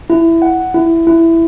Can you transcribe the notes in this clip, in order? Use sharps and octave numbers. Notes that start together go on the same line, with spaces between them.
E4
F#5
E4
E4